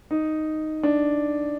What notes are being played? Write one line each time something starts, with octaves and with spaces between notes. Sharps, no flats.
D#4
D4